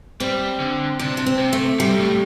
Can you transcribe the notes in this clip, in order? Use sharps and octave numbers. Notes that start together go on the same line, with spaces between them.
G3 C4
D3
C3 D4
D4
C4
C3
A3
C3 G3
A2